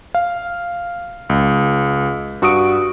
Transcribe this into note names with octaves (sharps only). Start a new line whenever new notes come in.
F5
C#2
G2 F#4 C#6 D#6 D7